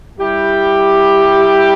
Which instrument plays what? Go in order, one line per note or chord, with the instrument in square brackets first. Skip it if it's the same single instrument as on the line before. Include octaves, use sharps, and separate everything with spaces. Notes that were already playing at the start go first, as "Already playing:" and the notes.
[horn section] G3 E4 G4